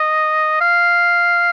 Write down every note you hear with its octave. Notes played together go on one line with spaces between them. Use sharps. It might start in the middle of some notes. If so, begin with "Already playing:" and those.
Already playing: D#5
F5